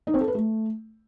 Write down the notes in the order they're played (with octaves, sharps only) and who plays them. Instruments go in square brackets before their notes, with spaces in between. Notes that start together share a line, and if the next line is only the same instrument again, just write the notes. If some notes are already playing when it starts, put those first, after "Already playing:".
[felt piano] D#4
C4
A4
B4
A3